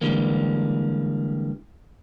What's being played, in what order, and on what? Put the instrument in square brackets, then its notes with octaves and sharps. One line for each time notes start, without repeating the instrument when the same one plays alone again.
[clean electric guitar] D3 E3 G3 G#3 A#3